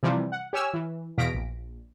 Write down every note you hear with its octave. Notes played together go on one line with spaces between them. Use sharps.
C3 E3 F3 G3
F#5
G4 C#5 G#5 E6 F6
E3
E2 B2 F5 A#6 B6 D7
A#1